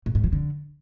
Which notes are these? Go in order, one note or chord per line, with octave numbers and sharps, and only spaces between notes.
A2
G#2
F3
D3